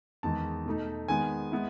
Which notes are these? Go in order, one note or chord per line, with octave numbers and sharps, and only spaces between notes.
E2 D#3 G#3 A5
B2 A3 D#4
D#3 G#3 B3 G#5
G#3 B3 E4